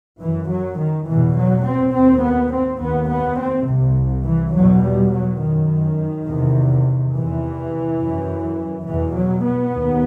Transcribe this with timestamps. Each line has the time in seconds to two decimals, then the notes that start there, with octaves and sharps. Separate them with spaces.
0.21 F#2 E3
0.50 F#3
0.80 D#3
1.08 E2 B2 E3
1.37 F#3
1.65 C4
1.94 D#2 C4
2.23 B3
2.52 C4
2.81 D#2 B3
3.10 B3
3.39 C4
3.68 C2 C3
4.25 E3
4.54 E2 B2 F#3
4.83 G3
5.12 F#3
5.41 F#2 D#3
6.27 E2 C3
7.13 E2 C3 E3
8.01 F#2
8.87 E2 B2 E3
9.16 F#3
9.45 B3
9.74 D#2